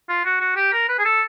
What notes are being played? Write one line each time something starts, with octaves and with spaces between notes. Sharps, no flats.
F4
F#4
F#4
G4
A#4
B4
G#4
A4